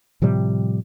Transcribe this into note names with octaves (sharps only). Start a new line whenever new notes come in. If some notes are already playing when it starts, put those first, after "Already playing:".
A2 C3 F3 G3